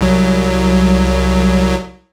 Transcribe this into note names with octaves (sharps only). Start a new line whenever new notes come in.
C2 F#3